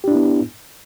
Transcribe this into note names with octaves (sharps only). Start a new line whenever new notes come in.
B3 D4 E4 G4